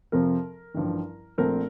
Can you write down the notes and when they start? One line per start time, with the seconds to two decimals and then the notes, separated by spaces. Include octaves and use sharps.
0.12 F2 C3 F3 C4 A#4
0.74 A1 G2 F3
1.38 A#1 A#2 A3 C4 A#4